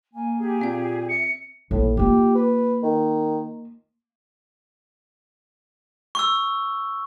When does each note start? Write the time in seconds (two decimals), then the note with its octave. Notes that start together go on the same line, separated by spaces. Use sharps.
0.14 A#3 G#5
0.39 G4 G#4
0.61 A#2 C4 F5
1.09 E5 C#7
1.71 A#1 A2
1.97 A#3 F4 G4
2.35 B4
2.83 D#3
6.15 C#6 E6